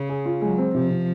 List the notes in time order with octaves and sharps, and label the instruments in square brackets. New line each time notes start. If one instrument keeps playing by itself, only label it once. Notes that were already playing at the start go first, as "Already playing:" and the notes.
Already playing: [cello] C#3
[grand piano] G#4
F4
[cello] F#3 [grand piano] G#3
[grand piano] C4
[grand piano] C3 [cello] F3
[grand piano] C3